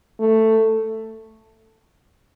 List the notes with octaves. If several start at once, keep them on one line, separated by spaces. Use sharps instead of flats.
A3